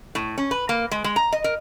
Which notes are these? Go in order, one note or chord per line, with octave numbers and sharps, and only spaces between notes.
A2
C#4
B4
A#3
G#3
G#3
A#5
D#5
A#4